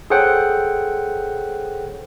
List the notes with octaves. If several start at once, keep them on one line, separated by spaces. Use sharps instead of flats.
G#4 A4 C5 C#5 F#5 G5